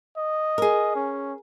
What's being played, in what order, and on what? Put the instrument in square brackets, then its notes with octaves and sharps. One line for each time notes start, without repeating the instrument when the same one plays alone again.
[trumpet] D#5
[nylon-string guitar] G#4 A#4
[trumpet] C#4